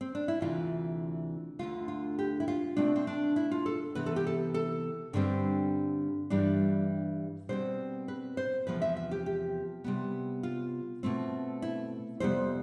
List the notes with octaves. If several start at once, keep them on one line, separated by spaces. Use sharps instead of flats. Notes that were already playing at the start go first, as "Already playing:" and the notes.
C4
D4
E4
D2 C3 E3 F4
D2 D3 A3 F4
F4
G4
E4
F4
B2 A3 C4 D4
C4
D4
E4
F4
A4
C3 E3 B3 B4
A4
G4
A4
A4
G2 D3 G3 C4 D4
G2 E3 G3 D4
B2 G3 C4 C5
B4
C5
E2 C3 F3 B3 B4
E5
E5
G4
G4
C3 G3 B3
F4
B2 A3 C4
E4
F2 C3 G3 B3 C5